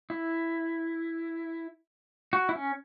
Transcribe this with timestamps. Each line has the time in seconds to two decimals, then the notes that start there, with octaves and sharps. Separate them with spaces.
0.10 E4
2.33 F#4
2.49 E4
2.55 C#4